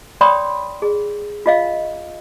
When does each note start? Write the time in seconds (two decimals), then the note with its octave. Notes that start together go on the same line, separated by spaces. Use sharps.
0.21 C#5 D5 G5 B5 C6 D#6
0.82 G#4
1.46 F4 D#5 F5